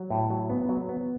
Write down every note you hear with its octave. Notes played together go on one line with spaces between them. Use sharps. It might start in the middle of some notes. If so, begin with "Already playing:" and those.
Already playing: F#3
A2
F#3
B3
F#3
B3